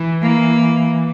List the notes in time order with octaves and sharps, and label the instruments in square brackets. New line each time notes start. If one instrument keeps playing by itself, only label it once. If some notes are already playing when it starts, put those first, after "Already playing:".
Already playing: [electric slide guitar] E3
[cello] A#3